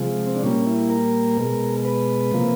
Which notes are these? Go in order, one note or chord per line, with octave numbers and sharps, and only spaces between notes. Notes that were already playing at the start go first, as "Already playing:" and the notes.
Already playing: C3 F3 G#3
C4
D4
A#2 G3 A#3 C#4
E4
A#4
B2 G#3
B4
C3 F3 A#3